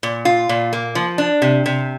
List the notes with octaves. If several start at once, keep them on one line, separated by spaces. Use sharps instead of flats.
A#2
F4
A#2
A#3
F3
D4
C3
C3